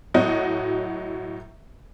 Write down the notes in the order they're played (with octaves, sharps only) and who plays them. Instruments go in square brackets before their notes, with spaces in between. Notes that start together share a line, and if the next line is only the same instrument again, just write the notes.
[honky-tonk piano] A2 F#3 F#4 D#5